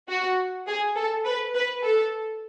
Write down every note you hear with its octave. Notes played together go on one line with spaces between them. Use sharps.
F#4
G#4
A4
B4
B4
A4